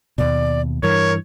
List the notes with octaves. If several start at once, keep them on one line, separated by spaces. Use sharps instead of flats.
D#2 B2 D5
G2 E3 A#4 C#5